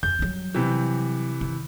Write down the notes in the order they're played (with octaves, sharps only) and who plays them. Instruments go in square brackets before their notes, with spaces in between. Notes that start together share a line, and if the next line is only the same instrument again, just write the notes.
[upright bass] F2 [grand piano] G6
[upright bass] F#3 G3
[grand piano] C3 E3
[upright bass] D#3